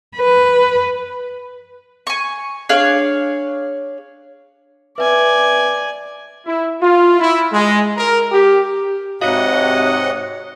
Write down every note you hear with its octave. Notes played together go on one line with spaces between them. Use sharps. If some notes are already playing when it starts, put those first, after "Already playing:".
B4
G#5 C#6
D4 G#4 C#5 F5
B4 D5 E5 G#5
E4
F4
E4
G#3
A#4
G4
G#2 C3 F#4 C#5 D#5 F5 F#5